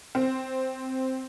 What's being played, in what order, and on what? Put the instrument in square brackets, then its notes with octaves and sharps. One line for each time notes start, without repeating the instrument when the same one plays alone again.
[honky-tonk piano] C4